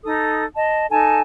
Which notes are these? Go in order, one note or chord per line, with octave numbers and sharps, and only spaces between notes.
D#4 A4 D#6
D#5 A5
D#4 A4 G#5 A5